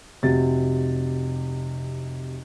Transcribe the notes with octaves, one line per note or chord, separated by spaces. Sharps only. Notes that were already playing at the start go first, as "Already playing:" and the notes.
F1 C3 F#4 A6